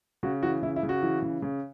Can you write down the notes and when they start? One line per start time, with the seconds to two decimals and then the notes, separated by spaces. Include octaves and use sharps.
0.23 C#3 F#4
0.43 E3 F#4
0.63 C#3 E4
0.76 E4
0.83 C#3
0.89 F#4
1.02 E3
1.22 C#3
1.42 C#3